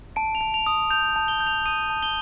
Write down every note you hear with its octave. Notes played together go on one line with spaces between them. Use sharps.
A5 D7
F7
A5
F7
D#6
G6 F7
A5
G7
G6
F7
D#6 D#7
A5
G7